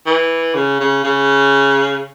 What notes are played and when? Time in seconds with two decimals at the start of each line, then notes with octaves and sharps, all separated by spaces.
0.06 E3
0.54 C#3
0.80 C#3
1.04 C#3